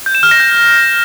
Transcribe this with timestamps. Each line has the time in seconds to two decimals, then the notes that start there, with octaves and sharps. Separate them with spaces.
0.06 G6
0.15 E7
0.23 F6
0.31 A#6
0.40 G6